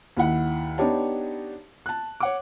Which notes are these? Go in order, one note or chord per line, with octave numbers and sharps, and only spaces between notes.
D#2 E4 F#5 B5
B3 D4 D#4 G4 C#5 A5
A5 F#6
C#5 F#5 D6